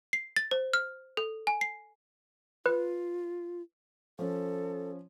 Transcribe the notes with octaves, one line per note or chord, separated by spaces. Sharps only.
C7
A6
C5
F6
A4
G#5
C7
F4 B4
F3 C#4 A4